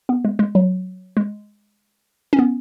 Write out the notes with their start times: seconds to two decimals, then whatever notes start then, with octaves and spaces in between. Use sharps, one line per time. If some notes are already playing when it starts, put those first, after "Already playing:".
0.09 B3
0.25 G#3
0.39 G#3
0.55 F#3
1.17 G#3
2.33 C#4
2.39 B3